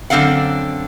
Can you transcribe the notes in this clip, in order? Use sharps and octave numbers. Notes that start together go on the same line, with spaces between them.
F#2 D3 C4 D4 F5 F#5